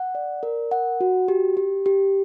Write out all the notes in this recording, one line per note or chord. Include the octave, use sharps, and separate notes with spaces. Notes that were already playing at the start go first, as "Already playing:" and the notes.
Already playing: F#5
D5
A#4
F#5
F#4
G4
G4
G4